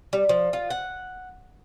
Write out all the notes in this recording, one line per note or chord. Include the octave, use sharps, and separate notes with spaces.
G3
F3
F4
F#5